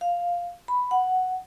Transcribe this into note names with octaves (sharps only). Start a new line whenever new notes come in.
F5
B5
F#5